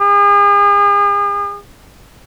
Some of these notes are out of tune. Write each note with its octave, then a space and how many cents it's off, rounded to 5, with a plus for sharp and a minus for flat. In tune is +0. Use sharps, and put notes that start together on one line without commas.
G#4 -40